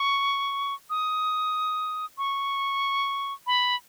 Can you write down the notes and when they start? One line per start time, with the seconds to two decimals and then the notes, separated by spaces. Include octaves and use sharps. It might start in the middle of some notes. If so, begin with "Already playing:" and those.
Already playing: C#6
0.90 D#6
2.18 C#6
3.47 B5